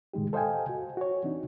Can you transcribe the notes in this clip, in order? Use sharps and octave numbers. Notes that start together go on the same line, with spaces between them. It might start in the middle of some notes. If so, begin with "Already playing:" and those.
A2 D#3 G#3 D#4 G4
A4 C5 D#5 F5 G5 G#5
F#4
F#4 C#5
E3 C4 D4 D#4